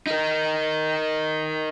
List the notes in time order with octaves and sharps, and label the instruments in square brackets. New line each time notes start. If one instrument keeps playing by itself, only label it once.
[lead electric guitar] D#4 A#4